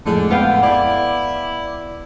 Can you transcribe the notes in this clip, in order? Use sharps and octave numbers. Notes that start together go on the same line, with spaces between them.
F2 A2 D3 G#3
B3 F5 G5
E4 D5 D6